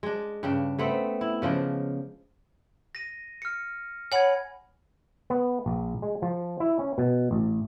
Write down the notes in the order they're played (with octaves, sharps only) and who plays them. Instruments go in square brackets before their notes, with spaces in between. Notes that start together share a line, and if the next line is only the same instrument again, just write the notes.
[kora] G#3 D4
G2 C#3 D4
A3 B3 C4
E4
C#3 F3 G#3 D4
[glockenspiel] A#6 D#7
F6 C#7
[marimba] C#5 F#5 [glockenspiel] G#5 B5 G#6
[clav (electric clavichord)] B3
A#1
G#3
F3
E4
C#4
B2
A1